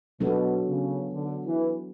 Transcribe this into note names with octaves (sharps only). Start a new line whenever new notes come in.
B2 F#3 B3 D4 F#4 A4
C#3
D3
E3